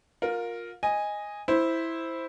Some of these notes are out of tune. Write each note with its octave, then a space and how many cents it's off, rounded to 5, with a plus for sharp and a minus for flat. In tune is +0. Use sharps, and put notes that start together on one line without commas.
F4 +25 A#4 +0
D#5 +0 G#5 -10
E4 -5 C5 +0